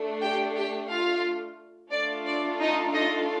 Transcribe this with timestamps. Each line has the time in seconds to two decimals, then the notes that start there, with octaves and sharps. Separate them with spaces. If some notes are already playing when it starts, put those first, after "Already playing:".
Already playing: A3 D4
0.22 G4 G5
0.56 G4 G5
0.90 F4 F5
1.92 A3 D4 F4 A4 D5
2.26 D5
2.60 D#4 D#5
2.94 D#4 D#5